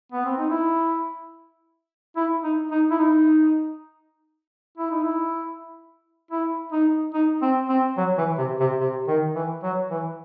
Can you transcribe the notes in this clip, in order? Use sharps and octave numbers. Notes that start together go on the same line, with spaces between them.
B3
C4
D#4
E4
E4
D#4
D#4
E4
D#4
E4
D#4
E4
E4
D#4
D#4
C4
C4
F#3
E3
C3
C3
C3
D#3
E3
F#3
E3